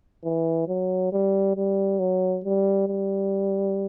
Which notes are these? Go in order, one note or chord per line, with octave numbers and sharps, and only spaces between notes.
E3
F#3
G3
G3
F#3
G3
G3